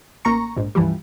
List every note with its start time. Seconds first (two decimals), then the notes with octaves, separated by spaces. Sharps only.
0.25 A1 A#3 A#5 C#6
0.56 A#1 G#2
0.75 C#2 G2 E3 F3 G3